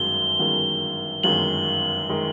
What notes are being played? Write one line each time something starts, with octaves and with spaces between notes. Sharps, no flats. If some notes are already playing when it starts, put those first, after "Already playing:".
Already playing: G1 F#2 D#3 G#3 G7
G1 F#2 D#3 G#3
G1 F#2 D#3 G#3 F#7
D#3 G#3